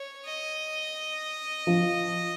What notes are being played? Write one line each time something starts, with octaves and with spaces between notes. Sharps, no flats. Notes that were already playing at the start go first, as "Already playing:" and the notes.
Already playing: C#5
D#5
F3